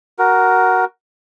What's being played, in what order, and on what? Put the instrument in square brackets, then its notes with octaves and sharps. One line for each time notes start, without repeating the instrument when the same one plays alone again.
[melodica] F#4 A#4